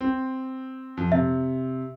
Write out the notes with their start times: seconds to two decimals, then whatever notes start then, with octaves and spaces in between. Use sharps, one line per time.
0.01 C4
0.97 F2
1.12 C3 E5